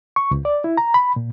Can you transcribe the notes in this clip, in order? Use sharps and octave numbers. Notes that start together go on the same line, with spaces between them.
C#6
C#2
D5
E4
A#5
B5
A#2